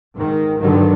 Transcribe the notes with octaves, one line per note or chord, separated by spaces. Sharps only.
G#2 D#3
G2 D3 D#3 F#3